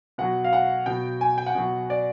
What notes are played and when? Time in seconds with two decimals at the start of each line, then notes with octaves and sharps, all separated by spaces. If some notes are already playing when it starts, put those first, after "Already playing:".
0.18 B2 F#3 F#5
0.44 F5
0.53 F#5
0.86 B2 F#3 G5
1.21 G#5
1.38 G5
1.46 F#5
1.55 B2 F#3
1.90 D5